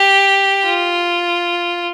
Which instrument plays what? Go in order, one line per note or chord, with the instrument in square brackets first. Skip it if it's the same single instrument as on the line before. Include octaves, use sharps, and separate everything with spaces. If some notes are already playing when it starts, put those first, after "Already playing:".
Already playing: [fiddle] G4
F4